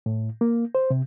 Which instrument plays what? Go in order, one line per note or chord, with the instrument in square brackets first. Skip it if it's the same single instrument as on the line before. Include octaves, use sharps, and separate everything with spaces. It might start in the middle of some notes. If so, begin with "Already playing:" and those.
[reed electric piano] A2
A#3
C5
C3